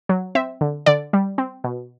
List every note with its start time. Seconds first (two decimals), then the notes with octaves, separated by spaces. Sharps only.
0.09 F#3
0.35 C4 E5
0.61 D3
0.86 D3 D5
1.13 G3
1.38 C4
1.64 B2